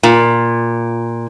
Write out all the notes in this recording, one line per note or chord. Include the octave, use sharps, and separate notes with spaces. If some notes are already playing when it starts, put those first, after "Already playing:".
A#2